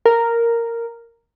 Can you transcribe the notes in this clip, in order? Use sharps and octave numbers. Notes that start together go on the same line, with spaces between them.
A#4